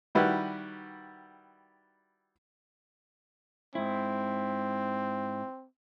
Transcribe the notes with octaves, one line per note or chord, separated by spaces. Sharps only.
D#3 G3 E4 F#4 B4
G#2 C4 E4